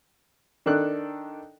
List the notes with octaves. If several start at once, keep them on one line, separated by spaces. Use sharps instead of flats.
D#3 D4 A4 F#6